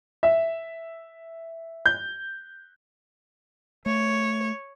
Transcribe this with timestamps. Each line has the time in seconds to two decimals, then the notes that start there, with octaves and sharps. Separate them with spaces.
0.23 E5
1.86 G6
3.86 A3 C#5